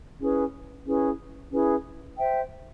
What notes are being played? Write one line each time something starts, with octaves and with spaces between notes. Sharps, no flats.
C#4 E4 G#4 B4
C#4 E4 G#4 B4
C#4 E4 G#4 B4
C5 E5 G5